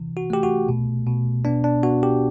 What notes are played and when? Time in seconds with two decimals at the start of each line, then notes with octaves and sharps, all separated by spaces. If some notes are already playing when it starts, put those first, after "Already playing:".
Already playing: C3 E3
0.17 F#4
0.30 A3 G4
0.43 F#4
0.69 B2
1.07 B2
1.45 B3 D4
1.64 D4
1.83 B3 F#4
2.03 G4